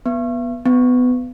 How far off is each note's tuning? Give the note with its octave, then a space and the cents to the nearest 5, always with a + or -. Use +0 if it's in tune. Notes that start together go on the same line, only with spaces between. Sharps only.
B3 -15
B3 +20